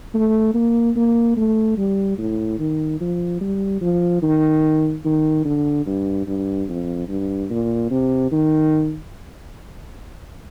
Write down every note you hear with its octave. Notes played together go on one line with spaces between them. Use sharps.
A3
A#3
A#3
A3
G3
A2
D#3
F3
G3
F3
D#3
D#3
D3
G2
G2
F2
G2
A#2
C3
D#3